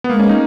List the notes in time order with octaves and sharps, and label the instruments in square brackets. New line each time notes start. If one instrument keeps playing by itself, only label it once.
[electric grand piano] B3
[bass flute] G#3 [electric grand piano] A#3
[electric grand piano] C#4
D#4